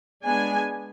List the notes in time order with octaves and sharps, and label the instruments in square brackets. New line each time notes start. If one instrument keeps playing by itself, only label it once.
[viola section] G#3 B3 D4 G#5